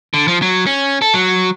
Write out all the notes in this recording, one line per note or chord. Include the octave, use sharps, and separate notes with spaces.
D3
F3
F#3
C#4
A4
F#3